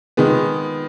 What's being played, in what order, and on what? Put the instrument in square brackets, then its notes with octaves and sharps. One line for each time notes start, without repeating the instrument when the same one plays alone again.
[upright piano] D#3 G#3 B3